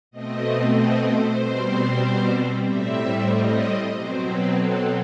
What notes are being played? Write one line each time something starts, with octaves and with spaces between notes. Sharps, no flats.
B2 A3 C4 D#5
D#5
C5
B2 G3 C4
A2 G3 C4 E5
D#5
B2 F#3 C4 C5
B4
A4